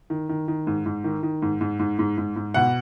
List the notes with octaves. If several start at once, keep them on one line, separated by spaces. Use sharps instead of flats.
D#3
D#3
D#3
G#2
G#2
D#3
D#3
G#2
G#2
G#2
G#2
G#2
G#2
B2 F#5